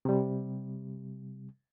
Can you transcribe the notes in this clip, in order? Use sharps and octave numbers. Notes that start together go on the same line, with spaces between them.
C3 G3